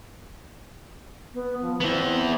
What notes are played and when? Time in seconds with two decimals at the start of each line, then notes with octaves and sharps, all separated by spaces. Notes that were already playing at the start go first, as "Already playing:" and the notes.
1.34 B3
1.62 F3
1.81 B3 C4 E4